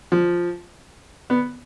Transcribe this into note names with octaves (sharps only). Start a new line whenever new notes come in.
F3
B3